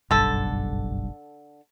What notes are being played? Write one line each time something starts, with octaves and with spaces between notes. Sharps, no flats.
F#1 B1 G2 D3 A4